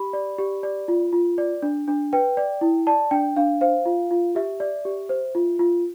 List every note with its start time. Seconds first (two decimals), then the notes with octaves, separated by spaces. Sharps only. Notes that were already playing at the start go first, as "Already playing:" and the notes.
Already playing: G4 B5
0.13 D5
0.38 G4
0.63 D5
0.88 F4
1.13 F4
1.38 D5
1.62 D4
1.88 D4
2.13 B4 G5
2.37 D5
2.61 E4
2.87 D5 A5
3.11 D4 G5
3.36 D4 F5
3.61 C5 F5
3.85 F4
4.11 F4
4.35 G4 E5
4.60 D5
4.85 G4
5.09 C5
5.35 F4
5.59 F4